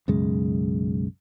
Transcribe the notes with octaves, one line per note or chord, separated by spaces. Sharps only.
B1 F#2 C#3 G#3